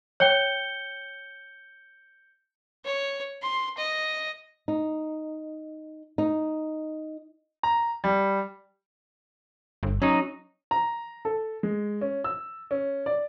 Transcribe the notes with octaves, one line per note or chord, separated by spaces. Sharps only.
C#5 G5 G6 C#7 G7
C#5
C6
D#5
D#4
D#4
A#5
G3
G1
F#3 C#4 D#4
A#5
A4
G#3
C#4
E6
C#4
D5